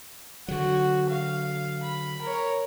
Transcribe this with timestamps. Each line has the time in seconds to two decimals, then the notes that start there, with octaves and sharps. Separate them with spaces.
0.48 D3 F#3 F#4
1.10 F5
1.83 B5
2.22 A#4 C#5